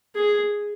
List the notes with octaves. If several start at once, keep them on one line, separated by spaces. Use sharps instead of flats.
G#4